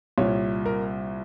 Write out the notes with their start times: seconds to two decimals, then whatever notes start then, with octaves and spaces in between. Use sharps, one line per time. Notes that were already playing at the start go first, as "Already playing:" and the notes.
0.18 C2 A#2 C#5
0.66 A#4